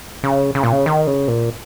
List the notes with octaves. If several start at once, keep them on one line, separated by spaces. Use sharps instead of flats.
C#3
C#3
A#2
C#3
D#3
C#3
A#2